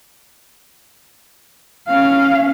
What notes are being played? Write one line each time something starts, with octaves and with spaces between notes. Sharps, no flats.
C#4 F5